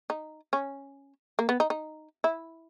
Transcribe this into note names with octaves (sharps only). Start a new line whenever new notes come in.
D#4
C#4
A#3
B3
D#4
D#4
E4